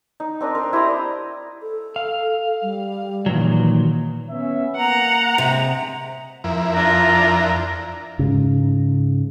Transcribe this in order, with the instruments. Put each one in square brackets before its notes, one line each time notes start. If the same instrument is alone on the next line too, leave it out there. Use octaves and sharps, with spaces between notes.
[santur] D#4
C4 D4 A#4 D#5
A#4 C6
E4 G4 D#5 A#5
[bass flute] A4
[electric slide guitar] F5
[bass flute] G3
[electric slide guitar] A#2 D#3 F#3 [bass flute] E3
[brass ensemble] B3 C#4 E5
[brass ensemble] A#3 [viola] F#5 [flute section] A#5
[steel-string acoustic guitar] C3 [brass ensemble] G#3
[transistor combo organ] F2 E4 A#4
[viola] D4 F4 [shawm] A#5
[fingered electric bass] G#2 C#3